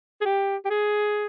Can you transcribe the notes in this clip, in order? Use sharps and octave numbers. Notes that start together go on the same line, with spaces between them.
G#4
G4
G4
G#4